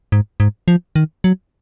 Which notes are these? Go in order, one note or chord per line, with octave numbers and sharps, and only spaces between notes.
G#2
G#2
F3
D#3
F#3